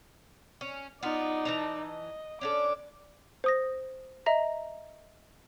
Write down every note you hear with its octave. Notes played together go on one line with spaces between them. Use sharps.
C#4
B3 D#4 F4 D5
E3 A5 A#5
D#5
C#4 D4 A4 D6
C5 D#6 A#6
D#5 E5 A#5 A#6